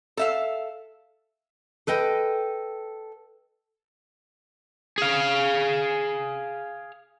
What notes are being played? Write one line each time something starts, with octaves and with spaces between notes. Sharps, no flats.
A4 E5 F5
A4 B4 D#5 G5
G#4 F5